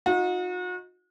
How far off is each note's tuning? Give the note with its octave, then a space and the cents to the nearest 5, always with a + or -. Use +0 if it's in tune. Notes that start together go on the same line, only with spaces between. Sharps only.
D#4 +20 F#4 -40